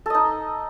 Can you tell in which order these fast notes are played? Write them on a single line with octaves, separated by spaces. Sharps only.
A4 D#5 D#4